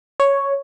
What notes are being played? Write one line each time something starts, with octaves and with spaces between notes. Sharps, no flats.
C#5